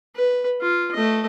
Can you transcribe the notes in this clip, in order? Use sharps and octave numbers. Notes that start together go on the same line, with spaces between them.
B4
F4
A3 D#5